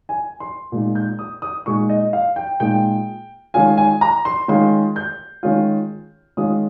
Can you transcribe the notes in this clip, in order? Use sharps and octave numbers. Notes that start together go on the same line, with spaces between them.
G#5
C6
A#2 G#3 D#4
G6
D#6
D#6
A#2 G#3 D#4 C#6
D#5
F5
G5
A#2 G#3 D#4 G5
D#3 G#3 C#4 F4 G#5
G#5
A#5
C6
D#3 G#3 C#4 F4 C6
G6
D#3 G#3 C#4 F4
D#3 G#3 C#4 F4 D#6